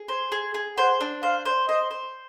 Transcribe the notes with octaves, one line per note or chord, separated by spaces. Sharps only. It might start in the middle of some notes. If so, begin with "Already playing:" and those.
Already playing: G#4
C5
G#4
G#4
C5 F#5
D4
C5 F5
C5
C5 D#5
C5